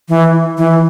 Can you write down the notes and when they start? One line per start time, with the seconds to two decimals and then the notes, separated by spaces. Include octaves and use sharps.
0.09 E3
0.58 E3